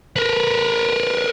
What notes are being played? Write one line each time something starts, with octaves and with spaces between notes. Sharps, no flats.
A#4 B4